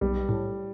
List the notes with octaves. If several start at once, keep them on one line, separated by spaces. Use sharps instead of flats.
B1 G3
A2